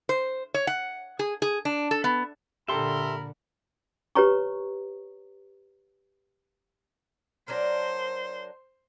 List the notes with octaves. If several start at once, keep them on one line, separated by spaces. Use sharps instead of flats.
C5
C#5
F#5
G#4
G#4
D4
A4
B3
A#2 D3 G4 A4 A#4 E5 B5 C6
G4 B4 C#5 A#5 C#6
F#3 D4 A#4 C5